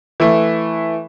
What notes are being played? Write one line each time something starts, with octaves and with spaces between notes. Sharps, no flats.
E3 A3